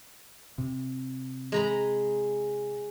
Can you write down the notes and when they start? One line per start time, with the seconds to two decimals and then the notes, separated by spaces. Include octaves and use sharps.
0.58 C3
1.52 G#3 A#5 B5